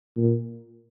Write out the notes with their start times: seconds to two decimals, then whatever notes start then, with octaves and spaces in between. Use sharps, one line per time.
0.17 A#2